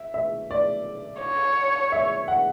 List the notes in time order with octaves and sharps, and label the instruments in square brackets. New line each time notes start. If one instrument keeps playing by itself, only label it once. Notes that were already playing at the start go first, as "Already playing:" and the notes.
Already playing: [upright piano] E5
E5
D5
[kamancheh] C#5
[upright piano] E5
F#5